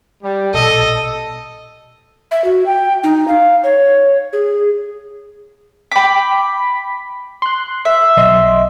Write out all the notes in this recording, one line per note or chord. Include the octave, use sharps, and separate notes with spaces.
G3
A#1 B2 A4 D#5
E5
F#4
G5
D#4
F5
C#5
G#4
G5 B5 D6 B6
C6 F#6
E5
B1 D#5 C6